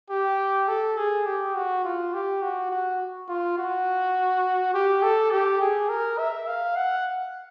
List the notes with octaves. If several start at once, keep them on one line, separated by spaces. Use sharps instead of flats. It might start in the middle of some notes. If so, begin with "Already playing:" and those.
G4
A4
G#4
G4
F#4
F4
G4
F#4
F#4
F4
F#4
G4
A4
G4
G#4
A#4
E5
F5
F#5